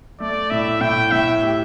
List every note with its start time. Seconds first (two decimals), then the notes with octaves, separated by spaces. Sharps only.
0.20 A3 D5
0.50 A2 E5
0.81 A2 G5
1.11 A2 E5
1.42 G4